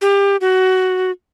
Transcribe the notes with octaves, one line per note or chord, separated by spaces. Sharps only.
G4
F#4